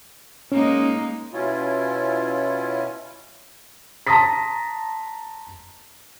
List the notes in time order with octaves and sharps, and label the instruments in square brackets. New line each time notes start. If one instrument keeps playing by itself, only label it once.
[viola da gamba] G#3 A#3 D#4 [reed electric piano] C#4
[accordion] B2 C#4 E4 F4
[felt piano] A5 A#5 C6 D#6 A#6 B6